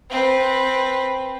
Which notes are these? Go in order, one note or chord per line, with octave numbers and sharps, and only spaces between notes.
C4 B4